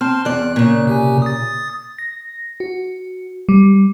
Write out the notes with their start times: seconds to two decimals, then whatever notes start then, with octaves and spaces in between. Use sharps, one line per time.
0.01 C4 A5 C6 F6
0.25 E2 D5 F#6
0.56 A#2 C#3
0.87 C3 G4 G#5
1.22 D#6 A6
1.98 A#6
2.60 F#4
3.49 G3